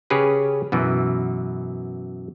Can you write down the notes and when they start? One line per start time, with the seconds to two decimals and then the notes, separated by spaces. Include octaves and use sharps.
0.10 C#3 C#4 G4 G#4 B4
0.72 F#2 B2 E3